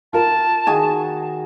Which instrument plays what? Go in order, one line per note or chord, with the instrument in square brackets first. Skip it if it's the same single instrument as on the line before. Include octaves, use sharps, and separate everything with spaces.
[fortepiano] F4 A#4 [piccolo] A5
[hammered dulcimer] D#3 F#4 G#4 [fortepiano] G#5